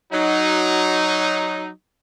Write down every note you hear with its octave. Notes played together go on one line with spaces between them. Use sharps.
F#3 D#4